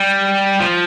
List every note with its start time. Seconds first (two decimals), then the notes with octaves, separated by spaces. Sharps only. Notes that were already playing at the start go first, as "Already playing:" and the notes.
Already playing: G3
0.60 F3